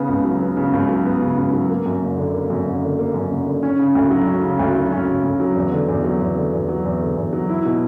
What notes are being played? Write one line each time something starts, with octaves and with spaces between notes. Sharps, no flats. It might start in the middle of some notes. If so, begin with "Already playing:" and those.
Already playing: C#3 B3
C#2
F#3
B3
C#3
C#2
F#3
B3
C#3
C#2
F#3
A#3
F#2
F#1
D3
A#3
F#2
F#1
D3
A#3
F#2
F#1
D3
C#4
C#3
D2
F#3
C#4
C#3
D2
F#3
C#4
C#3
D2
F#3
E2
D3
E2
F#3
E2
D3
E2
F#3
E2
D3
E2
F#3
E4
B2